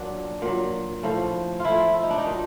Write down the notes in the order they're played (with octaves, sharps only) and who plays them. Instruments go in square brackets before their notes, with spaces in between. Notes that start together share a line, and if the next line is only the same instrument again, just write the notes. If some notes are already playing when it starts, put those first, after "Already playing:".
Already playing: [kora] A#2 F#3 D4
A#2 F#3
A2 F3
F4
A2 F3 E4
E4
D#4
D4
D#4
A#2 F#3 D4